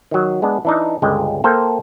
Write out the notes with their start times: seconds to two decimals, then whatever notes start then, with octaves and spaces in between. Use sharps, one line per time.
0.11 D#3 F#3
0.42 G#3 B3 D4
0.65 E3 D4 D#4
1.02 G1 C#2 D3 G#3 G5
1.44 A#3 A4 C5 G5